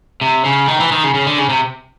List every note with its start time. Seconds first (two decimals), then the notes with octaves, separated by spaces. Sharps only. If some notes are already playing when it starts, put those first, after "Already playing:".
0.21 C3
0.44 C#3
0.68 D#3
0.80 E3
0.92 D#3
1.03 C#3
1.14 C#3
1.27 D3
1.38 C#3
1.49 C3